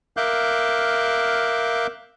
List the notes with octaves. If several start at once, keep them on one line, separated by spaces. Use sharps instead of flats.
A#4 E5 F5 D6 F#6 G6